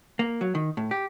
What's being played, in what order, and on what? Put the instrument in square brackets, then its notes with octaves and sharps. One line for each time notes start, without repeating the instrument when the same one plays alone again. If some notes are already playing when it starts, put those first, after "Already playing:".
[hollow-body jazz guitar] A#3
F#3
D#3
A2
G4